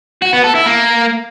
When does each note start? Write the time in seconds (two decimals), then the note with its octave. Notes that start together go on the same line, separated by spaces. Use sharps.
0.22 F#4
0.33 B3
0.44 A4
0.55 E4
0.66 A#3